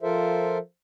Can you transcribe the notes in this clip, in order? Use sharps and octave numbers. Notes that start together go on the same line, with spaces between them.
F3 F4 A4 A#4 C5 E5